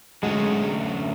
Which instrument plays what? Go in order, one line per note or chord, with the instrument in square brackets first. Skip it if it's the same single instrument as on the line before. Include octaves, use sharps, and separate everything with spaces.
[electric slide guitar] D3 F#3 A3 C#4 F#4 [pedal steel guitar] G#3